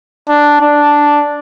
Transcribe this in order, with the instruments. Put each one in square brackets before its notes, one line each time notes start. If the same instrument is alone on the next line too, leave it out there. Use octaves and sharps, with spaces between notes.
[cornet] D4
D4